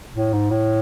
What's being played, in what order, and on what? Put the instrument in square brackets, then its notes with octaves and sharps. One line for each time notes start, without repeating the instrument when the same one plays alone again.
[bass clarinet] A2
G#2
A2